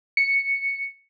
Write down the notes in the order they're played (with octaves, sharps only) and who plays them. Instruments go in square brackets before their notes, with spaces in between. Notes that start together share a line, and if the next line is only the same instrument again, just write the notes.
[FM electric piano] C#7